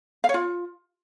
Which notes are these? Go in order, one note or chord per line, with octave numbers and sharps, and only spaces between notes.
F5
C#5
F4